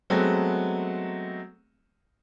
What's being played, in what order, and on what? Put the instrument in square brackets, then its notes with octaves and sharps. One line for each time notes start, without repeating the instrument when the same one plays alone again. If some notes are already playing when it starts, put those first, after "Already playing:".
[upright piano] F#3 G#3 A3 B3 C4